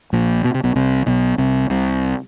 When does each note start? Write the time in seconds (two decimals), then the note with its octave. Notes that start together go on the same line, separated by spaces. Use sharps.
0.13 A#1 A#2
0.44 B2
0.54 C3
0.63 B1 B2
0.75 C2 C3
1.06 B1 B2
1.38 C2 C3
1.70 C2 C3